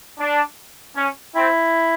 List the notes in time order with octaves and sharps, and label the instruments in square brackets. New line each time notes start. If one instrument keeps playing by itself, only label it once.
[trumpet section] D4
C#4
[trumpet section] C4 [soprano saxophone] E4